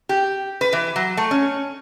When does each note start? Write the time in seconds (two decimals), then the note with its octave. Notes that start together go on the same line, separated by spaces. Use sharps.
0.09 G4
0.61 B4
0.73 E3
0.96 F#3
1.17 A3
1.31 C#4